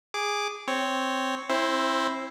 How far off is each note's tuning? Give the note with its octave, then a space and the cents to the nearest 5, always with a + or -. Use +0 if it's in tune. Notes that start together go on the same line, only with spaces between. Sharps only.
G#4 -10 D6 +0
C4 +0 C#5 +0
C4 +30 E4 +0 C5 +0